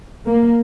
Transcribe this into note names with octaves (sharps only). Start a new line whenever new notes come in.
A#3